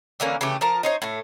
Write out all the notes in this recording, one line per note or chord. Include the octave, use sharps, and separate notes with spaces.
D3 E3 A#3 C#4
C#3 E3 A3 G4
F3 A#4 A5 A#5
D#4 C5 C#5
A2 A3